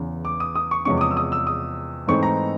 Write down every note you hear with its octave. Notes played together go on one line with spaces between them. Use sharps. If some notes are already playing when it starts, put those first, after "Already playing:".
Already playing: E2 C#3 E3
D6
D#6
D#6
C#6
E2 C3 F3 G#3 C#4 C#6
D6
D#6
E6
D#6
E6
D#6
G#2 E3 A3 C4 D#4 C#6
A#5